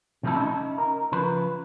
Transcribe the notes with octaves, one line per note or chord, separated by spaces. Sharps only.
C3 F3 A3 D#4 E4 A4
C#4 D#4 D#5 E5 B5
A#4
C#3 F3 B4